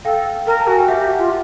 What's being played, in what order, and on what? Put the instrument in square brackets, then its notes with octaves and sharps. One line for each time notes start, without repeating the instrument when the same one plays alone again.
[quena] A4 [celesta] F5 G5
[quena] A#4 [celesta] A#5
[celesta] A5
[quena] F#4 [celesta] G#5
[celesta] G5
[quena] G4 [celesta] E5 F#5
[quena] F4